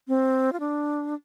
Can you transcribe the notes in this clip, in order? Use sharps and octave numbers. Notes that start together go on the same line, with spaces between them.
C4
F4
D4